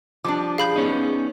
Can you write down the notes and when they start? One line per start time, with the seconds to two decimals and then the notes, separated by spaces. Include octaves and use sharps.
0.24 F3 G3 D4 D6
0.58 G#4 F5 B5 G6
0.76 B3 C#4 D#4